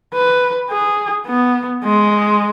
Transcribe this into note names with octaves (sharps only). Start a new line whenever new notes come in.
B4
G#4
B3
G#3